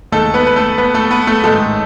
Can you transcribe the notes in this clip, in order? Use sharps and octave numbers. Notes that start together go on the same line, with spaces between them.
D#2 D#3 G#3 A3 A4
B3 B4
B4
A3 A4
B3 B4
A3 A4
B3 B4
A3 A4
A1 G#2 D#3 G#3 A3 A4